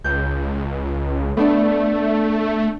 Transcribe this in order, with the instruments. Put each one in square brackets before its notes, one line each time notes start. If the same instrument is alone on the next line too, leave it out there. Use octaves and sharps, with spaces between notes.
[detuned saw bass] C#2 [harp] G6
[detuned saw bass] A3 [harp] B3 D4 D5